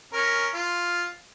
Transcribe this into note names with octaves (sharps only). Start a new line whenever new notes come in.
C#4 A#4
F4